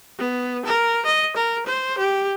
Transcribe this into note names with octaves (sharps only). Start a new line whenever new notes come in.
B3
A#4
D#5
A#4
C5
G4